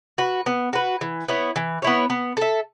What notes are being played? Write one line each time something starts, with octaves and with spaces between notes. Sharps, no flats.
F#4 B4
B3
F#4 B4
E3
B3 E4 C#5
E3
B3 E4 C#5
B3
A4 E5